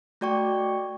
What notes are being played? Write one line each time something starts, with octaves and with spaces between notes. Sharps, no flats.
A3 F#4 D5 G5 C#6